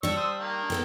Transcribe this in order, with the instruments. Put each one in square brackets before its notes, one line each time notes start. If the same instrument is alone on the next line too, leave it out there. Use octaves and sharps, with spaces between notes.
[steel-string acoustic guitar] G3 D4 [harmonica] C#5 C#6 E6
[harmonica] C5 D#6 E6
D#3 A#3 F5
[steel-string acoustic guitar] B3 A4 G5